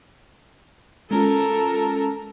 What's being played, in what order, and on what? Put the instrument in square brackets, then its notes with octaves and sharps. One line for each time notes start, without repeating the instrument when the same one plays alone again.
[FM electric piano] G#3 C#4 F4 [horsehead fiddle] A4 A#4